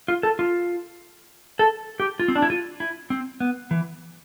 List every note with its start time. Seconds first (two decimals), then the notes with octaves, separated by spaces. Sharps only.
0.08 F4
0.23 A4
0.39 F4
1.59 A4
2.00 G4
2.20 F4
2.28 C4
2.36 D4
2.42 E4
2.50 F4
2.80 E4
3.10 C4
3.40 B3
3.71 E3